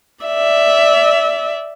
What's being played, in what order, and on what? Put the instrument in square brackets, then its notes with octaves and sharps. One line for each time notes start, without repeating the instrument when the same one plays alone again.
[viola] D5 E5